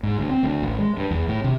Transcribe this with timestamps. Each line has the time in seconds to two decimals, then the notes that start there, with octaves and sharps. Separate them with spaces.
0.03 G#2
0.19 D2
0.30 C4
0.43 D2
0.63 A1
0.79 G#3
0.97 G2
1.11 E2
1.28 A2
1.44 C3